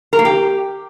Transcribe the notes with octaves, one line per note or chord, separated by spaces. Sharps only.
A#4
A#3
G4